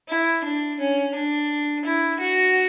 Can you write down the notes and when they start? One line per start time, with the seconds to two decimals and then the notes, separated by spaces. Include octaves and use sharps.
0.09 E4
0.44 D4
0.79 C#4
1.14 D4
1.85 E4
2.20 F#4